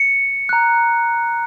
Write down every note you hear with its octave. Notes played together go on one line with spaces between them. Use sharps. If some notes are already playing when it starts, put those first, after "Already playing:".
Already playing: C#7
A#5 F#6